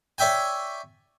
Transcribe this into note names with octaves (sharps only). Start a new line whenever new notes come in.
C#5 D5 E5 G5 G#5